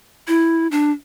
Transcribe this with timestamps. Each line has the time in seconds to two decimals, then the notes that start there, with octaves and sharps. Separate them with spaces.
0.28 E4
0.71 D4